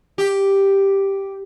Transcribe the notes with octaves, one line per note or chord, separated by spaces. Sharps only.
G4